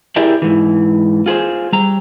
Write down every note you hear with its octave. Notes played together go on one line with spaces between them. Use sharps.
E4 G4 G#4 A#4 D5 E5
G#2 E3
F4 G#4 B4 C5
G3 A#5